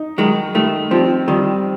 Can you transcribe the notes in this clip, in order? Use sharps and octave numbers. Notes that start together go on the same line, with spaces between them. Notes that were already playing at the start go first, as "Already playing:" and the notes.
Already playing: D#4
D#3 F#3 G#3
D#3 G3 A3
F3 G3 C4
D#3 F3 G3